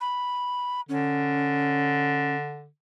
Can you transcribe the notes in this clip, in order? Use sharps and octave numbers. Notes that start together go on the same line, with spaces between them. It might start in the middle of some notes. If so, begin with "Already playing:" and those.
B5
D3 C#4